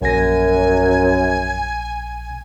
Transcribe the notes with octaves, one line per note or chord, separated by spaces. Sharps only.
A#1 F#2 G#5 A#6